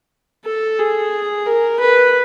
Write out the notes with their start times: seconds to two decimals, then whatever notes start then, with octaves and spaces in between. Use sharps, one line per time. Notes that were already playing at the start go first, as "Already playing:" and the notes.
0.46 A4
0.79 G#4
1.46 A#4
1.80 B4